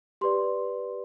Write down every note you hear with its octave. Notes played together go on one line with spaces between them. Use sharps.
G4 B4 D5 C6